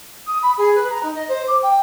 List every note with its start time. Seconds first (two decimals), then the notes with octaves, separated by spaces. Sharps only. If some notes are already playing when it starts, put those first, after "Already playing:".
0.27 D#6
0.42 B5
0.58 G#4
0.75 B4
0.90 A#5
1.03 D#4
1.16 D#5
1.29 C5
1.48 D6
1.63 G5